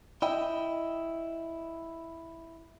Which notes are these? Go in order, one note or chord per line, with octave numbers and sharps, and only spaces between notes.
E4 D#5 G5